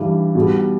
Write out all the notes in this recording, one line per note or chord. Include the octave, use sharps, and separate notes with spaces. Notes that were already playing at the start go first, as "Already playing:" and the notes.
Already playing: G2 E3 G3
B2 G3